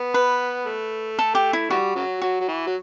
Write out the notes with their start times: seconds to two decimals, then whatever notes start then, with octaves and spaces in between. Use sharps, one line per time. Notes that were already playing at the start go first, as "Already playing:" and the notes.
Already playing: B3
0.14 B4
0.66 A3
1.19 A4
1.35 G4
1.53 E4
1.70 E3 G3 F#4
1.96 C#3 F#3
2.21 F#3 F#4
2.40 F#3
2.48 E3
2.66 F#3